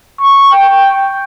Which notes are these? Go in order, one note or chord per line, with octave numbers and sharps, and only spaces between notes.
C#6
G5